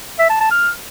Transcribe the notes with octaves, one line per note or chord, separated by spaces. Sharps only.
E5
A5
A5
F6